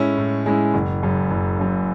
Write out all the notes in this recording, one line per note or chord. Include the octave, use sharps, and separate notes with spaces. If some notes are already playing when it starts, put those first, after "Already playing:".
Already playing: A2 G#3 C#4 E4
A2
G#3 C#4 E4
F#1
F#2 C#3
F#1
F#2 C#3